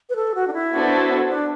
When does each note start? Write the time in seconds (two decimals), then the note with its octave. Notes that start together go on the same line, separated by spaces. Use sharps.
0.10 B4
0.16 A4
0.35 F#4
0.48 D4
0.53 E4
0.73 B3 D4 F#4 A4 C5
1.29 D4